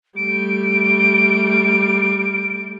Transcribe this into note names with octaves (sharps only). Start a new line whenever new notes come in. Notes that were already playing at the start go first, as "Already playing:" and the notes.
G3 A3 D7